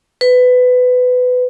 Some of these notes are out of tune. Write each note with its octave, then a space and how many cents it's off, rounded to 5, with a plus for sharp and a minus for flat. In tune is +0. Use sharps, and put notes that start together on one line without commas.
B4 +20